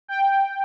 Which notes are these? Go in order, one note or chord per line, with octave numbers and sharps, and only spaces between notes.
G5